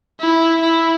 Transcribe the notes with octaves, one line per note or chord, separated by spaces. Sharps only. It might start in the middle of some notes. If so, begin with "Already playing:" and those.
E4
E4